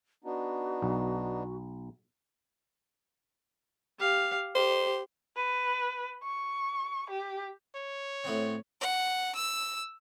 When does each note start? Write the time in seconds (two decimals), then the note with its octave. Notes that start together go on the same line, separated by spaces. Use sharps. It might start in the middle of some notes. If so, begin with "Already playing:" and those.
0.24 B3 D4 D#4 F#4
0.82 B1
3.99 G4 F5
4.55 G4 C5
5.37 B4
6.23 C#6
7.10 G4
7.75 C#5
8.24 A2 B3 C4
8.81 F#5
9.35 E6